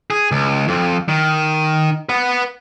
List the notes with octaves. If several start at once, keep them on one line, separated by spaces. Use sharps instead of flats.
G#4
C#2
F2
D#3
B4 F#5